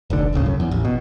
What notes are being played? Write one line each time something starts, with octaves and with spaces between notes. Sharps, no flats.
F1 B1 D3
D1 G#1 C#2 C#3
F#2
E2
A1
B2